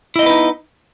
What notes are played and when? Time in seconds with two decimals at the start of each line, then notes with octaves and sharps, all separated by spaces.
0.16 E4
0.19 D#5
0.23 B3
0.26 B4
0.30 D#4